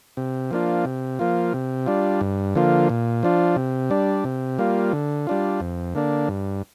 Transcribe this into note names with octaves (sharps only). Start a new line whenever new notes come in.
C3
F3 A#3 D4 F4
C3
F3 A#3 F4
C3
G3 D4 F4
G2
D3 F3 A#3 F4
A#2
F3 D4 F4
C3
G3 D4
C3
G3 A#3 F4
D3
G3 D4 F4
F2
D3 A#3 D4
G2